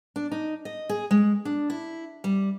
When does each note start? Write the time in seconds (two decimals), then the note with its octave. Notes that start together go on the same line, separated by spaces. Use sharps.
0.16 D4
0.31 D#4
0.65 D#5
0.89 G#4
1.11 G#3
1.45 D4
1.70 E4
2.24 G3